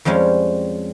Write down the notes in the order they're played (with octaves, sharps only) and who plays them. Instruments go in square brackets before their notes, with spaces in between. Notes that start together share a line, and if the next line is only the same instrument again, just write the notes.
[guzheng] F2 F3 G3 G#3 C#4